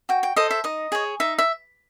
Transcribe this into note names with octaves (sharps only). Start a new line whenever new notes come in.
F#4 G5
G5
A4 C5 D#5
E5
D#4 D#5
G#4 C#5
D#4 E5
E5